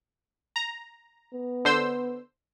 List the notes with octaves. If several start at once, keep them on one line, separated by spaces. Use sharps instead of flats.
A#5
B3
D3 C5 E6